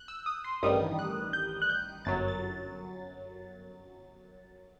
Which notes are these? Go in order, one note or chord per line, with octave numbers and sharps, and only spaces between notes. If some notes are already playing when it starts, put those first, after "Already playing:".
Already playing: F#6 G6
E6
D#6
C6
A1 G2 D#3 G3 D#6
F#6
G6
F#6
G6
G1 F#2 F#3 A6
A6